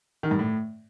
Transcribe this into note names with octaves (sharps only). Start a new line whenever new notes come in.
D#3
G2
A2